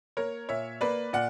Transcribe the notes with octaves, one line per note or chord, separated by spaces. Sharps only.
A#3 A#4 C#5
A#2 C#5 E5
A#3 B4 D5
A#2 D5 F#5